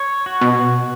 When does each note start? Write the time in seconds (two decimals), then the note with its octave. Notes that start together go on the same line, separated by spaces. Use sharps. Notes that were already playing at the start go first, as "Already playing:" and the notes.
Already playing: C#5
0.26 F#4
0.41 B2